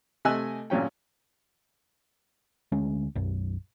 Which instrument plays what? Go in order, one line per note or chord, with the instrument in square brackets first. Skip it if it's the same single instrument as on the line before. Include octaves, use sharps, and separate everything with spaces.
[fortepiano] C3 A3 D#5 G#5 E6 F#6
G#1 A#2 F#3 C#4 G5
[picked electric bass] D2 G#3 C#4
B1 F#2